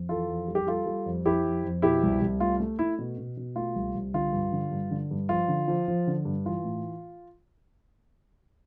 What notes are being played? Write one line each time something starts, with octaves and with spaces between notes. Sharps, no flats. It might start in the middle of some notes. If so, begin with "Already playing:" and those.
Already playing: F2
E3 F4 A4
F2
G3
G4
G3 F4 A4
G3
F2
F2 E4 G4
F2
F2
B2 E4 G4
C2
C2
A3 F4
A3
A3 E4
B2
B2
B2
A3 F4
C2
C2
D3 F4
G2
D3
G2
D3
G2
F3 F4
D3
F3
F3
D3
G2
E3 F4
A2